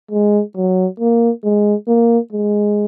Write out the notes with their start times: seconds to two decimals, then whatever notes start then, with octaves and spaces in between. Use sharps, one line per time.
0.11 G#3
0.56 F#3
1.00 A#3
1.44 G#3
1.88 A#3
2.32 G#3